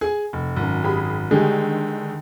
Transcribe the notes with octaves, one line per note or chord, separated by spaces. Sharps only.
G#4 G#5
F1
G#1 F#2
G4 G#4 B5
D3 D#3 G3 G#3 G4 G#4